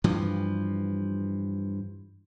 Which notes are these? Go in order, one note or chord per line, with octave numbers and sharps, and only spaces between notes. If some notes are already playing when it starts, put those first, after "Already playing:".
G2 E3 F3